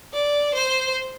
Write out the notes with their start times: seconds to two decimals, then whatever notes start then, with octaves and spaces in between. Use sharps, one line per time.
0.14 D5
0.54 C5